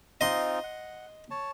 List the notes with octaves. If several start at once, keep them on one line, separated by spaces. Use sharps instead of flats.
C4 D#4 F4 D#5 C6
F#5
C#5 A5